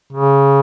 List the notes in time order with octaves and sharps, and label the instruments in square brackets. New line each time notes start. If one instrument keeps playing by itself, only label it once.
[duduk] C#3